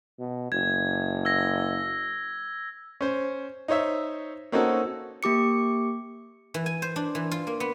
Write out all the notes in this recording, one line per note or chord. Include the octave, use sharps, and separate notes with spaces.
B2
F#1 G#6
E6 G#6 A#6
C#4 C5
D#4 C5 C#5 E5
A#3 C4 C#4 D#4 F#4 A4
A#3 G4 D6 C#7
E3
G#5
C5
D4
E3
F4
A#3
B3